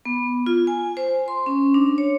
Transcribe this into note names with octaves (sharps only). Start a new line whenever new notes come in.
B3
F4
G#5
C5
C6
C#4
D4
C#5